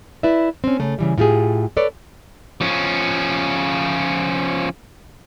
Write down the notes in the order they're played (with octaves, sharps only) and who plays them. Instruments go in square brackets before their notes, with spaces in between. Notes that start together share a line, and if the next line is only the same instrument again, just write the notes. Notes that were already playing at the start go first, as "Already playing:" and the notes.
[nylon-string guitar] E4 B4 D5 E5
C4 C#4
C#3 A3
C#3 E3 G3
A2 F4 G4 G#4
A4 B4 C#5 D5
[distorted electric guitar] F3 C#4